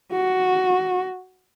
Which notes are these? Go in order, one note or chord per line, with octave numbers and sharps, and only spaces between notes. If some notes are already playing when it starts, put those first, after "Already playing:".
F#4